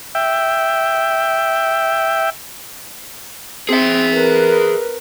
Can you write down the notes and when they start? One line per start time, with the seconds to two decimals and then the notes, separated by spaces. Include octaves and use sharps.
0.15 E5 G5
3.69 C4 G#4 E5
4.12 A#4 B4